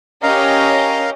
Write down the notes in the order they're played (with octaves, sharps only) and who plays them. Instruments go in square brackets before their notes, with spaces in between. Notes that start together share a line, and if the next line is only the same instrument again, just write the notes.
[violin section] C#4 G4 D#5 [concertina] A#4 F5 A#5